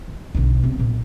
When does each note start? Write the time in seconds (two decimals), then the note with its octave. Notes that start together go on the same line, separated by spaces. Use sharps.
0.08 E3
0.35 B1 D3
0.64 C3 B3
0.79 A#2